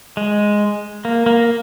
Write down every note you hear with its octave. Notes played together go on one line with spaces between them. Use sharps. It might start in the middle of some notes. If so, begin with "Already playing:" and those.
G#3
A#3
A#3